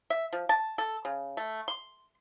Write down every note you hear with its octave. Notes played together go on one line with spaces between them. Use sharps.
E5
F3
A5
A4
C#3
A3
C6